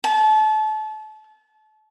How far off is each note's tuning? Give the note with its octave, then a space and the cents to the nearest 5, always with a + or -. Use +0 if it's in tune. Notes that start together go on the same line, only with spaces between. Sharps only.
A5 -30